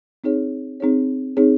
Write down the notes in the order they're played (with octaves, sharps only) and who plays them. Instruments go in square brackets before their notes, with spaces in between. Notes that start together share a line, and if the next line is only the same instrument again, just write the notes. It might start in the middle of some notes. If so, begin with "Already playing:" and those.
[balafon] C4 D#4 G#4 C#5
C4 D#4 G#4 C#5
C4 D#4 G#4 C#5